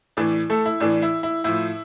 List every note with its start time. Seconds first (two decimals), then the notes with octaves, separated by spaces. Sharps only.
0.17 A2 E3 D4 D5
0.50 A3 A4
0.66 E4
0.80 A2 E3 D4
1.02 E4
1.23 E4
1.44 A2 F3 E4